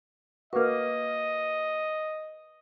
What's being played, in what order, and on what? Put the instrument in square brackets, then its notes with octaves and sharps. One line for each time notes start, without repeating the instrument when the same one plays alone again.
[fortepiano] A#3 F#4 [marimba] B4 D6 F6 [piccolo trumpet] D#5